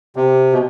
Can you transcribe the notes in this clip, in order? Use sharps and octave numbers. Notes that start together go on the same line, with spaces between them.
C3
B2